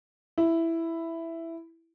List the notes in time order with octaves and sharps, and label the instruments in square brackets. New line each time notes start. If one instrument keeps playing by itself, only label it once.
[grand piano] E4